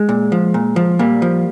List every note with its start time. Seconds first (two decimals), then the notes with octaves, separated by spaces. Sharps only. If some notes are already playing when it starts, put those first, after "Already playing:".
Already playing: G#3
0.09 A#2
0.32 F3
0.54 A#2
0.76 F3
0.99 A#2 G3 A#3
1.22 F3